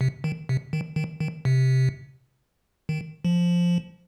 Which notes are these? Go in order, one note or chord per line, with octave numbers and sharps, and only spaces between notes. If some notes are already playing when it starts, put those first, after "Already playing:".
C3
D#3
C3
D#3
D#3
D#3
C3
D#3
F3